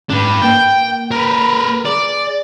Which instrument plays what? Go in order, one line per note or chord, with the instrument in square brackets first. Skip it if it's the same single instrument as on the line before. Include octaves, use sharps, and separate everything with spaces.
[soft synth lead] G#2 [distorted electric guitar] D4 B4
[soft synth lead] A#3 [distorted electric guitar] G5
[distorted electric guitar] A#4 B4
[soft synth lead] G#4 [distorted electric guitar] D5